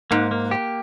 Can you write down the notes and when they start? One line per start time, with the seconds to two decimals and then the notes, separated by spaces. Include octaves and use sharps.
0.11 G#2 A#3
0.31 A#3
0.51 G4